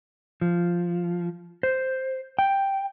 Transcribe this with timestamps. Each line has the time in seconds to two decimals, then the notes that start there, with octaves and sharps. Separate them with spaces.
0.41 F3
1.63 C5
2.39 G5